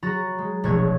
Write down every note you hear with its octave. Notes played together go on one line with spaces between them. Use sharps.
F#3 F#4 A#5 B5 A6
G#3
E1 A#1 A3 F#4 C#5 G#6